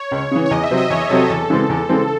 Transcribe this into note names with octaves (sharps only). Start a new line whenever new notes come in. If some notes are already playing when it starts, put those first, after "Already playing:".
Already playing: C#5
C#2
C#3 E3
C#5
E2 D#5
E5
C3 F#3 C4
D#5
E2 C#5
C3 F#3 C4 A4
E2 A4
C#3 E3 G#3 C4
E2
C#3 E3 G#3 C4